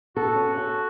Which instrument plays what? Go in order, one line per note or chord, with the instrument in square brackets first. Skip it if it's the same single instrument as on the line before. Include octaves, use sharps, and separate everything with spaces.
[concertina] F#4 [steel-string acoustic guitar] A4
[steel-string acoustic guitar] C#4
A4